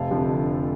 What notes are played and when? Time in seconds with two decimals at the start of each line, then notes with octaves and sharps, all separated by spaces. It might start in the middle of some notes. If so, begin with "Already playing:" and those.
Already playing: F1 F5 A5
0.11 F2 D3 F3